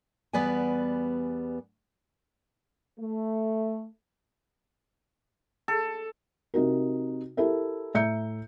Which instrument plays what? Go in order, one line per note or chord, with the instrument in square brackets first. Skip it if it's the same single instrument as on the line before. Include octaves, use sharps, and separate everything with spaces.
[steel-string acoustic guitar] E2 G3 B3 B4 D5 G#5
[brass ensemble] A3
[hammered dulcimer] A4
[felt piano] C3 D#4 F#4 A#4
E4 G4 A4 A#4 E5
A2 E5 A#5 G6 C#7